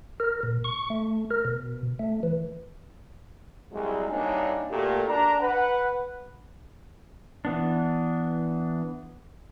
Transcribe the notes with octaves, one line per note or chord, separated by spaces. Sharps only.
A#4
A#2
C#6
A3
A#4
B2
A3
E3
C2 F#3 G#3
C2 A#3 D4 D#4 C#5 G#5
A#2 A3 F#4 G4 A4 A#4
D4 A#5
B4 F#5
E3 B3 D4